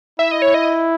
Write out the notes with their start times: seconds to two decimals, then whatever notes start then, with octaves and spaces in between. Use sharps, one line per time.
0.19 E4 E5
0.31 D#5
0.42 C#5
0.54 D#5